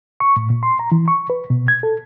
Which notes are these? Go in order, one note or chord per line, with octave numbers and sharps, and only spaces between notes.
C#6
A2
A#2
C6
A#5
E3
C#6
B4
B2
G#6
A4